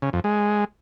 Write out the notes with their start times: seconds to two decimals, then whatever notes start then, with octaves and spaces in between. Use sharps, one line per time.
0.02 C#3
0.13 F2
0.24 G#3